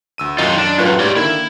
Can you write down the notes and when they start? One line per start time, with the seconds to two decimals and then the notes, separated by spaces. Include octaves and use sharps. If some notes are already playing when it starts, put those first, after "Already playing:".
0.18 D2 E6 D#7
0.38 F#2 D#3 D#4 F4 D#5
0.58 D4
0.78 F#2 A2 F4 B4
1.00 G#2 G4 C#5 D5
1.16 D3 D#3 A#3 E4